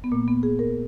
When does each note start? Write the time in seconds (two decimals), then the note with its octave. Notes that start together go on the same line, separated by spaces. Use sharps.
0.04 B3
0.11 A#2 A#3
0.28 B3
0.43 G#4
0.59 A#4